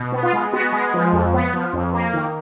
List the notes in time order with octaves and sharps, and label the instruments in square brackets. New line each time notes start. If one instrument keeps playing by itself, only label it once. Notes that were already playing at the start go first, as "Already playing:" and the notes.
Already playing: [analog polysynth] B2
B3
F4
G#3
B3 F#4
G#3
F3
F2
B3
F3
F2
A#3
D#3